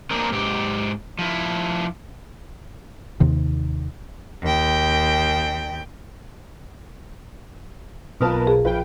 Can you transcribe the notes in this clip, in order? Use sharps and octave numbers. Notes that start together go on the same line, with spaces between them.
A#3 C4 D4 G#4 A#4
G#2 G4
F3 E4
D#2 C3 D#3
D#2 G5
B1 B2 F4 A#4 B4 A5 D#6
G#4
A#1 F4 B4 G5